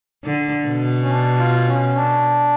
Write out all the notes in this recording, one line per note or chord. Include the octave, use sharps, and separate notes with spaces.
D3
B2
C#4
D4
F4
C#4
D4